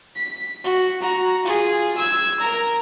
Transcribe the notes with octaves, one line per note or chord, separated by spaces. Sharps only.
B6
F#4
F#4 A#5
F4 G#4
E6 G#6
A#4 A#5